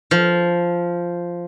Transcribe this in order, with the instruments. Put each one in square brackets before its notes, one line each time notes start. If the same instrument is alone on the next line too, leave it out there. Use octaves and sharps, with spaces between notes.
[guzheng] F3